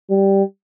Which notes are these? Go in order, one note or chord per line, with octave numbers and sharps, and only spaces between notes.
G3